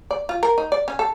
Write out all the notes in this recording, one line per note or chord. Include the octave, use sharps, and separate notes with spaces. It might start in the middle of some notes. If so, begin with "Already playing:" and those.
D5
F4
A#4
D#4
D5
C#4
A4